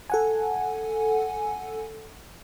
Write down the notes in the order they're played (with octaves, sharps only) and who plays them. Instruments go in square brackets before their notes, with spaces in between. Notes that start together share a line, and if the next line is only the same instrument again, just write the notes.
[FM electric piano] A4 F#5 G#5